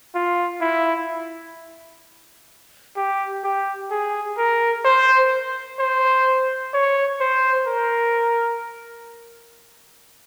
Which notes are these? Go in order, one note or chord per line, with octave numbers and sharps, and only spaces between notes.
F4
E4
G4
G4
G#4
A#4
C5
C5
C#5
C5
A#4